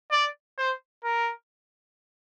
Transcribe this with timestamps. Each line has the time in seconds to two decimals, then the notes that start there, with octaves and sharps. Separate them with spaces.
0.12 D5
0.58 C5
1.04 A#4